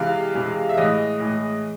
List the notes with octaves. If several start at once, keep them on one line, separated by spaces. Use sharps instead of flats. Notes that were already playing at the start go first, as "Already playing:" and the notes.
Already playing: C3 E3 G#3 F5
C3 E3 G#3
E5
A2 E3 G#3 D#5
A2 E3 G#3